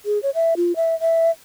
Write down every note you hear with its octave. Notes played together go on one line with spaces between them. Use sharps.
G#4
C#5
E5
F4
E5
E5